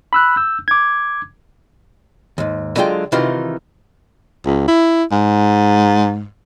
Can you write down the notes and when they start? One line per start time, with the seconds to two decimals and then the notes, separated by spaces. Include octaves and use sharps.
0.13 B5 E6 F#6
0.37 E6 G6
0.68 D6 G#6
2.38 D#2 G#2
2.76 D3 F#3 G#3 F4 G5
3.12 C3 D#3 E3 D#4 F4 F#4
4.45 C#2
4.68 E4
5.12 G#2